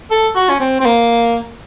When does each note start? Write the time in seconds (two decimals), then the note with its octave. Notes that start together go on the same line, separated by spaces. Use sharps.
0.11 A4
0.35 F#4
0.49 C#4
0.60 C4
0.80 C4
0.85 A#3